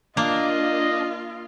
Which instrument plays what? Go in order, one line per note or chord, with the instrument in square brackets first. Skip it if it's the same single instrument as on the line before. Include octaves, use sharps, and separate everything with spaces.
[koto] A#3 [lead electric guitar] D4 [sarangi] F4 [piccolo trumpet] D#5